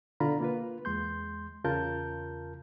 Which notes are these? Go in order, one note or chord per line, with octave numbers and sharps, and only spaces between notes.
B2 D3 F4 A#5 B5
A#3 F4 B4
E2 G#3 C6 G6
E2 C#3 F4 A#4 A5 G6